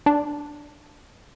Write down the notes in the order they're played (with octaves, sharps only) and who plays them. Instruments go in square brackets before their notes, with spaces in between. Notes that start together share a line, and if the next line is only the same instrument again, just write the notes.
[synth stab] D4